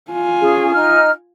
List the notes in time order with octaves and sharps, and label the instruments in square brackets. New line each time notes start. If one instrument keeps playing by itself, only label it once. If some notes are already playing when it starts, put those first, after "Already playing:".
[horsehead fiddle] F4 G#5
[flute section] C#4 G#4
D#4 F6